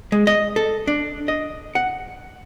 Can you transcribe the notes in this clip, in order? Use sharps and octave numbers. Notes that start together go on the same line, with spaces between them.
G#3
D#5
A4
D4
D#5
F#5